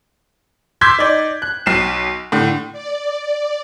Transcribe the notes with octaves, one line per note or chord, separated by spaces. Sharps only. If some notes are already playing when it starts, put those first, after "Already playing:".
C6 D6 E6 G6 G#6 B6
D#4 D5
F#6
B1 C7 E7
A2 D3
D5